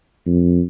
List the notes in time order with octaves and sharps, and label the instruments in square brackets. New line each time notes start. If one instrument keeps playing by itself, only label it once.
[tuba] F2